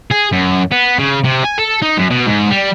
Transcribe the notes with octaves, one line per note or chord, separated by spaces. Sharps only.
G#4
F#2
B3
C#3
C3
G#5
A4
D#4
F#2
B2
G#2
G3